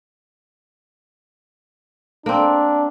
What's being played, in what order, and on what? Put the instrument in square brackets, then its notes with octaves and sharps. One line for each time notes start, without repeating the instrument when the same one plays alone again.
[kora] A#3 C4 [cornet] D4